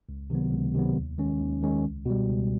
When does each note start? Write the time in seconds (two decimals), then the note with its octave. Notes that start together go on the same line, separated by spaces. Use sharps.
0.09 C#2
0.30 C3 D#3 F#3 B3
0.52 C#2
0.74 C3 D#3 F#3 B3
0.96 D#2
1.18 D#3 G#3 C#4
1.40 D#2
1.62 D#3 G#3 C#4
1.85 C#2
2.06 B2 G3
2.28 C#2